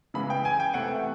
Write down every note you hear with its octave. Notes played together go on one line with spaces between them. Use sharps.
C#3 E3 G#3 B3 B5
G5
G#5
G5
C3 E3 A3 F#5